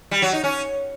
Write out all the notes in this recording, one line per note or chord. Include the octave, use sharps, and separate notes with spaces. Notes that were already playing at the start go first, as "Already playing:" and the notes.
G3
F#3
D#4
C#4